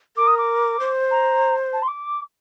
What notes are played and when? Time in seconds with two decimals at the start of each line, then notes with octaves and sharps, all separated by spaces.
0.17 A#4 D6
0.27 D#6
0.38 D6
0.80 C5
1.11 A#5
1.73 A5
1.82 C6
1.87 D6